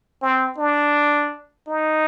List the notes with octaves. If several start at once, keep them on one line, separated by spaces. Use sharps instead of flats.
C4
D4
D#4